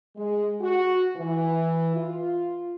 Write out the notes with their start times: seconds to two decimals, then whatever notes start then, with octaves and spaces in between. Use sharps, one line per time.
0.16 G#3
0.61 F#4
1.16 E3
1.95 F4